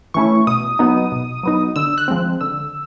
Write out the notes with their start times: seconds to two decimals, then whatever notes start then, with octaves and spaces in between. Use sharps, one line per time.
0.14 E3 A3 C#4 E4 C#6
0.47 B2 D#6
0.79 F#3 B3 D#4
1.12 B2
1.43 F#3 B3 D#4
1.76 D3 E6
1.98 F#6
2.08 F3 G#3 C4
2.41 D3 E6